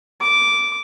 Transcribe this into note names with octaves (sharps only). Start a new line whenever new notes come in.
D6